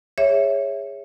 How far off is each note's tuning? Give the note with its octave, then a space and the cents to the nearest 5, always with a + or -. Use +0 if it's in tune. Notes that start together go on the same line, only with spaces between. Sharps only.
G#4 -20 C#5 +0 E5 +0